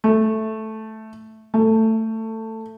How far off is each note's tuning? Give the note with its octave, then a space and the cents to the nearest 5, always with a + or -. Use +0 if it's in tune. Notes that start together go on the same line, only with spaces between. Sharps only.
A3 -5
A3 +15